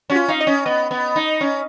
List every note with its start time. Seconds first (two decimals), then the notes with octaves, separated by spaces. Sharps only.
0.10 C#4 F#4
0.16 F4
0.28 D#4 F5
0.41 D#5
0.47 C#4
0.66 B3 D#5
0.91 B3
1.16 D#4
1.41 C#4